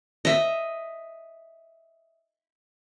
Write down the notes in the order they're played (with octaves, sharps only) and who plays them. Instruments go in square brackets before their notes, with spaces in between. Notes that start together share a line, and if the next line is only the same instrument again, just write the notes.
[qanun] D#5 E5